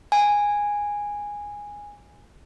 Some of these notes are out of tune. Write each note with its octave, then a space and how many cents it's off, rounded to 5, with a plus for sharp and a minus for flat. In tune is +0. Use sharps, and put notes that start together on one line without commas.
G#5 -10